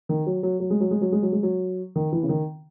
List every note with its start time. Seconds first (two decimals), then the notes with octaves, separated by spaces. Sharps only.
0.09 D#3
0.26 F#3
0.43 F#3
0.60 F#3
0.70 G#3
0.80 F#3
0.91 G#3
1.01 F#3
1.12 G#3
1.23 F#3
1.32 G#3
1.43 F#3
1.96 D#3
2.12 E3
2.23 C#3
2.29 D#3